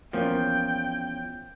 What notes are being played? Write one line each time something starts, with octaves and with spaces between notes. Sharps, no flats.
E2 F3 A#3 C#4 G5